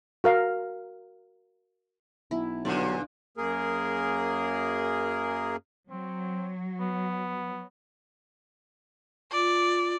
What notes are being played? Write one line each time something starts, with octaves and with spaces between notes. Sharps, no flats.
F#4 A#4 F5
B1 E4
B1 G2 A#2 D3 F#3 D5
F#2 A#3 G#4 A#4
F#3 C4
B3
F4 D5